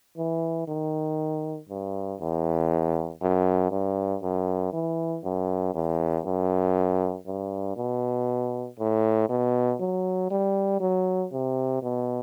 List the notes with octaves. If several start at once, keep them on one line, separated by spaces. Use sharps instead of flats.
E3
D#3
G2
E2
F#2
G2
F#2
E3
F#2
E2
F#2
G2
B2
A2
B2
F#3
G3
F#3
C3
B2